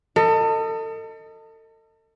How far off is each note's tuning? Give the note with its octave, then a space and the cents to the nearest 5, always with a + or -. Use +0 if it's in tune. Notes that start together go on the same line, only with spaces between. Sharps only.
A4 +35 D#5 +0